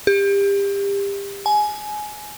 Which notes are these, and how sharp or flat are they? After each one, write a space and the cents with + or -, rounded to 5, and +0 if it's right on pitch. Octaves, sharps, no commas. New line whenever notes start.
G4 +30
G#5 +20